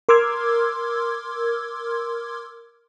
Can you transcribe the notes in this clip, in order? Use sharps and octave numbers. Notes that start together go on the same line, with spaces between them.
A#4 C6 D6 E6 F6 G#6